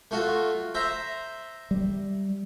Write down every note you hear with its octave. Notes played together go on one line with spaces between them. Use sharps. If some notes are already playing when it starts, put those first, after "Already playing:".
A3 F4 F#4
C5 E5 A#5
G3